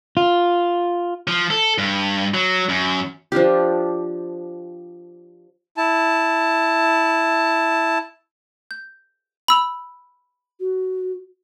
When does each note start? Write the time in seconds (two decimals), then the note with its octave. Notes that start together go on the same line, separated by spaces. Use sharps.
0.17 F4
1.28 F3
1.50 A4
1.78 G2
2.34 F#3
2.69 F#2
3.32 F3 D4 F4 G4
5.77 E4 A5
8.71 G6
9.48 B5 E6 F7
10.60 F#4